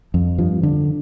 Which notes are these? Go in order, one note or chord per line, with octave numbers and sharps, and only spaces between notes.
F2
G2 F3
D3